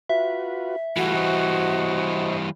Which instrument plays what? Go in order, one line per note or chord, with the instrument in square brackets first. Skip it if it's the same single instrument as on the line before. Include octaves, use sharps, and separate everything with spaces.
[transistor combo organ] F4 F#4 B4 [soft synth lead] E5
[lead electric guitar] E3 G3 [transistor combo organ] A3 F4 [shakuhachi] F#4
[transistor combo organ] C5 D#5 C#6